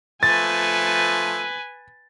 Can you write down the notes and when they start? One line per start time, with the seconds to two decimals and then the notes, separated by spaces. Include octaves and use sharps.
0.23 F3 A3 B4 G#5 A6